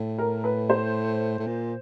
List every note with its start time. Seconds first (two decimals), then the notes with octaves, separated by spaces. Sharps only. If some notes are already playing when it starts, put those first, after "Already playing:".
Already playing: A2
0.18 A#4
0.44 B4
0.70 C5
1.39 A2
1.47 A#2